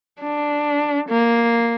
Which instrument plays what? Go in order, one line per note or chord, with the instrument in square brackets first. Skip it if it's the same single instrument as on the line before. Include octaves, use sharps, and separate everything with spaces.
[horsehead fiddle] D4
A#3